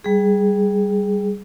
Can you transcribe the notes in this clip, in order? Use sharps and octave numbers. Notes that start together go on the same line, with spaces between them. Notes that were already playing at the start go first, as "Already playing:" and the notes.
G3 G#4